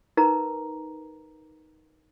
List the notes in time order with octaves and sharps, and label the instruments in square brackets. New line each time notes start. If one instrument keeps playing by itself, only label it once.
[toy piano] D#4 A#4 B4 A#5